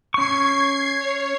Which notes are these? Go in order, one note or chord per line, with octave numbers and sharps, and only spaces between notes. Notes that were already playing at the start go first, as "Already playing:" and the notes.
C#4 C#6 G#6 C7
C#5